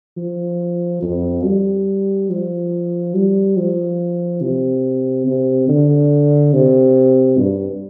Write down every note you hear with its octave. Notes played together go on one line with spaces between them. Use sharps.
F3
F2
G3
F3
G3
F3
C3
C3
D3
C3
G2